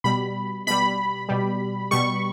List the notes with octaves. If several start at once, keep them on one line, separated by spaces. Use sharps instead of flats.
B2 G3 B5
B2 G3 B5
B2 G3
B2 G3 C#6